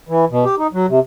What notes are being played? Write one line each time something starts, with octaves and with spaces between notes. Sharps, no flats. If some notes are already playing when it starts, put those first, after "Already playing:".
E3
B2
G4
D#4
F#3
C3